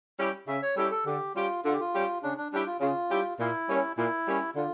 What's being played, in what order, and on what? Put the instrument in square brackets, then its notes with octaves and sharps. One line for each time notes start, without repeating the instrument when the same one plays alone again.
[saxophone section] G3 C#4 E4 G4
[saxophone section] C#3 [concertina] E5
[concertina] C#5
[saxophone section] G3 C#4 E4 G4 [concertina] A4
[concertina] A4
[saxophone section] D3 [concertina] G4
[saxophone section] G3 C#4 G4 [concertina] F4
[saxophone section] D3 [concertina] F4
[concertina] G4
F4
[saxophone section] G3 C#4 G4
[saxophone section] C#3 [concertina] D4
[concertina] D4
[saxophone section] G3 C#4 E4 G4 [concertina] D4
[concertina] F4
[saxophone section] C#3 [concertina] F4
[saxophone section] G3 C#4 E4 G4
[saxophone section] A#2 [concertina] E4
[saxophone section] G3 A#3 C#4
[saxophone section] A#2 [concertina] E4
[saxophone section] G3 A#3 C#4
[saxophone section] D3 [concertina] F4